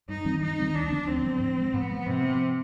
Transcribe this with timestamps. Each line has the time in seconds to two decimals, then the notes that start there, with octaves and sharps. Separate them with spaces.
0.08 G2 D#4
0.25 D#3 G3 C4
0.41 G2 D#4
0.59 D#3 G3 C4
0.75 D2 D4
0.91 D3 F3 B3
1.07 D2 C4
1.24 D3 F3 B3
1.40 G#2
1.57 F3 G#3
1.74 G#2 B3
1.90 F3 G#3
2.06 G#2 C3
2.22 F3 B3